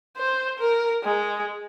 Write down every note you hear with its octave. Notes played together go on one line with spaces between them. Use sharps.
C5
A#4
G#3